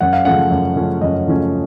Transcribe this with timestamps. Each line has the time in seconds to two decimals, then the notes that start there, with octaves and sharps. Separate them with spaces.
0.01 F#2 F#5
0.13 F5
0.25 C#3 F3 A3 C#4 F#5
0.51 F#2
0.76 C#3 F3 A3 C#4
1.01 F#2 D#5
1.27 C#3 F3 A3 C#4